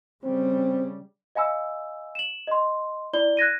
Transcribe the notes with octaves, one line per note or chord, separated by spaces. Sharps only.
C#3 G3 C4
D#5 F5 G#5 B5 E6
E7 F#7
D#5 C6
E4 D5 B5 G7
F#6 G#6 A#6 D#7